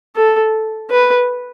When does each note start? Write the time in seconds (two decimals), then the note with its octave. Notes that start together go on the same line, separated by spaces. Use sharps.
0.16 A4
0.91 B4